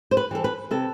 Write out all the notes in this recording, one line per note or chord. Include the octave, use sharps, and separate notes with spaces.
C5
B4
E3 G3 A4
B4
C3 A4